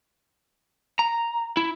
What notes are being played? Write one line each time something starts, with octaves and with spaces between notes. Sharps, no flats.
A#5
E4